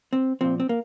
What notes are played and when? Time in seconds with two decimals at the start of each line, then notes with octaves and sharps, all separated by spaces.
0.13 C4
0.41 A#2 F3 C4
0.60 C4
0.69 A#3